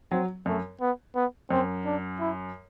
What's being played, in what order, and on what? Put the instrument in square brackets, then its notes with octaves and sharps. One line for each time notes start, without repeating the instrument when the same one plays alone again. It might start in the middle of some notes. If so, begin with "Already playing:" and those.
[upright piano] F#3 [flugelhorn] C4
[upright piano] F#2 [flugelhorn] A3
[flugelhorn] B3
B3
[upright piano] F#2 [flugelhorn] C4
[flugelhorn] D4
E4